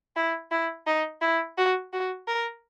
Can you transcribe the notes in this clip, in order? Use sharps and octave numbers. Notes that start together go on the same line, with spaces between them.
E4
E4
D#4
E4
F#4
F#4
A#4